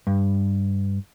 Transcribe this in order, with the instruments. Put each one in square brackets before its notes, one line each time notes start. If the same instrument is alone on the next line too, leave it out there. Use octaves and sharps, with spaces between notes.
[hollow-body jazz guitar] G2